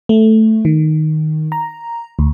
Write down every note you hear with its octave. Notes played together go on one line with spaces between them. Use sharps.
A3
D#3
A#5
D2